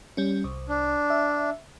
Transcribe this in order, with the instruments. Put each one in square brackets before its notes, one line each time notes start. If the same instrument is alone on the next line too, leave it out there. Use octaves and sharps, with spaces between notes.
[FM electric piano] G3 C#4
C2
[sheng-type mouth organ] D4
[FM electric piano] E5